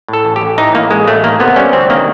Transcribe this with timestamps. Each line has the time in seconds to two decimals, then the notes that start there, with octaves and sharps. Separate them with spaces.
0.08 A2 A4
0.25 A1
0.36 G4
0.41 A1
0.58 E3 D#4
0.75 A2 A#3
0.91 A1 G#3
1.07 A1 A3
1.24 D#3 A#3
1.40 C3 B3
1.56 G3 C#4
1.73 D2 C4
1.89 D#3 A#3